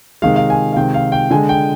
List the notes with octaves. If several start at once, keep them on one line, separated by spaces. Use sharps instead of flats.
C3 D#3 G#3 F5
F5
G#5
F5
C3 D#3 G#3 G5
F5
G5
D3 G#3 G#5
G5